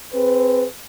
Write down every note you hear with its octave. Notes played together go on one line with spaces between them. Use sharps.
C4 G#4 B4